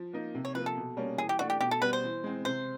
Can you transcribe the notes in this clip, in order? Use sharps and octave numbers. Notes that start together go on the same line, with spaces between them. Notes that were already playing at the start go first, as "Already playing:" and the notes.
Already playing: F3
A#3 D#4
C3
C#5
F3 A#3 B4
A4
B2
G3 A#3 C#4
E3 G#4
G4
A3 D4 F#4
G4
B2 G4
A4
G3 B3 B4
C5
E3
G#3 C4
C3 C5